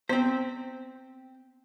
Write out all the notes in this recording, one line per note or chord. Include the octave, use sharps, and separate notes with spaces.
B3 C4 C5